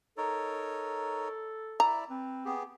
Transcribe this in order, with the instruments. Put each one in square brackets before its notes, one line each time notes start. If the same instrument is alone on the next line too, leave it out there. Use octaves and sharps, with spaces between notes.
[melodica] D#4 A#4 C#5 [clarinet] A4
[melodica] E4 D5 E5 [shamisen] A#5
[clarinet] C4 [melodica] B4
[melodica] B3 G4 G#4